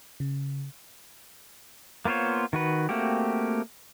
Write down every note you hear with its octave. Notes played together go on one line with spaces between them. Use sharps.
C#3
A#3 B3 F4 C5 C#5
D#3 F#4 B4
A3 A#3 C4 F#4 G4